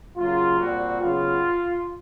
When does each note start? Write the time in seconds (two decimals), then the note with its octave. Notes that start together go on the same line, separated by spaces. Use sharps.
0.17 C#3 F#3 A#3 F4
0.59 A#2 G3 C4 F#4
1.01 C#3 F#3 B3 F4